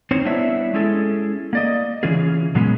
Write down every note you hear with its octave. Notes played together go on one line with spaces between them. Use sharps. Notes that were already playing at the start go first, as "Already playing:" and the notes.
C4 D#4 C5 C#5
G3 B3 D4 E4 C#5 E5
G#3 C#4 E4 G#4 A4
A#3 D5 D#5
C#3 E3 C#4 F4 G#4
A#2 F#3 G#3 B3 C#4